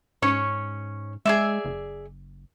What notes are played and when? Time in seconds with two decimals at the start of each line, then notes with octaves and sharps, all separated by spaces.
0.22 G#2 C#4 C#5
1.25 G#3 G#4 D5 E5
1.65 F#1